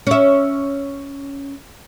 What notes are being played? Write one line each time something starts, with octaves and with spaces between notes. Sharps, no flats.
C#4 E5